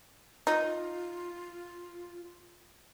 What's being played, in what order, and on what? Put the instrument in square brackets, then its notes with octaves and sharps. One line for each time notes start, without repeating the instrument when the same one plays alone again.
[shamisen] D#4 [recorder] F4